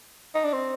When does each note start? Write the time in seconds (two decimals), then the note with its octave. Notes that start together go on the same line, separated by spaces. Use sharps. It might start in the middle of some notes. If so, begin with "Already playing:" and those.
0.35 D#4
0.45 D4
0.53 C4